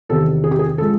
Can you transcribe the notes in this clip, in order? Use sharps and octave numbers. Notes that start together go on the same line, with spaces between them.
E2 C3 D#3 A4
G#4
G4
G#4
F3 G#3 A4